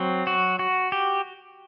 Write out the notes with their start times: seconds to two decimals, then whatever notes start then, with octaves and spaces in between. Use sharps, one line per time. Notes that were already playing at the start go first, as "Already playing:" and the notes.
Already playing: F#3 C4
0.27 F#4
0.59 F#4
0.92 G4